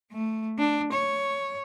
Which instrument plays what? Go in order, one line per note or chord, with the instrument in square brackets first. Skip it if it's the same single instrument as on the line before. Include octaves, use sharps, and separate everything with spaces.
[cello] A3
D4
C#5